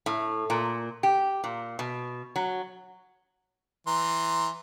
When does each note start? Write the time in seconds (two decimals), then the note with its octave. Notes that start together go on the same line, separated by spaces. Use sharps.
0.06 A2
0.50 A#2
1.03 G4
1.44 A#2
1.79 B2
2.36 F#3
3.87 E3 A#5 C6